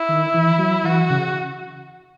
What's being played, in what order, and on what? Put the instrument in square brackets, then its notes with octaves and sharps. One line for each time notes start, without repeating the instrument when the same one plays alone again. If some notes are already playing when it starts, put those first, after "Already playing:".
Already playing: [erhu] E4
[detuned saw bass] D#3
E3
F#3
[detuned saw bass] E3 [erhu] F#4
[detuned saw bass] C#3